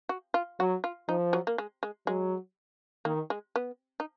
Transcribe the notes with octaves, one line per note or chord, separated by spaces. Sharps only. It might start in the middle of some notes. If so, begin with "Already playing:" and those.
F#4
F4
F#3 F#4
F4
F3 D#4
F#3
A#3
G#3
G#3
F#3 G#3
D#3 A#3
G#3
B3
D#4